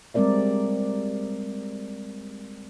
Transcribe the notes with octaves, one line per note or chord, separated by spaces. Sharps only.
G3 G#3 C4 A#4 D5 E5